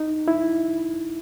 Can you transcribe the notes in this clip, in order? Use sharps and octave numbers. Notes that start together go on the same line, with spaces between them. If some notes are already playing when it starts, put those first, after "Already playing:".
Already playing: D#4
E4